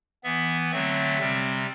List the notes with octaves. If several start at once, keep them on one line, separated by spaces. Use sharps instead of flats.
E3 B3 E5
D3 F#3 A3 C4 E5
C3 G3 C4